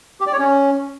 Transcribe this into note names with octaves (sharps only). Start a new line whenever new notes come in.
G4
D5
C#5
C#4